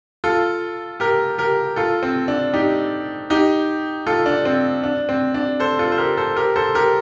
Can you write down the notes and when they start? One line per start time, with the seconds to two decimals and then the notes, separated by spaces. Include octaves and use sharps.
0.24 F4 A4
1.00 G4 A#4
1.38 G4 A#4
1.76 F4 A4
2.03 C4
2.28 D4
2.54 D#4 G4
3.30 D#4 G4
4.07 F4 A4
4.26 D4
4.45 C4
4.84 D4
5.09 C4
5.34 D4
5.60 A4 C5
5.79 F4 A4
5.92 C5
5.98 G4 A#4
6.17 A4 C5
6.36 G4 A#4
6.56 A4 C5
6.75 G4 A#4